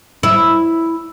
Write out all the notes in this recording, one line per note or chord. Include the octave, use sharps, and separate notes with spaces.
E4